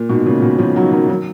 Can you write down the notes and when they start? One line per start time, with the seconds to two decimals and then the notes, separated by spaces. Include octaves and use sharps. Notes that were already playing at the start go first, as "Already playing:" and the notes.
Already playing: A#2
0.09 G#2 B2
0.26 A#2 C#3
0.42 B2 D#3
0.58 C#3 F3
0.75 D#3 F#3
0.92 D#3 F#3
1.09 D#3 F#3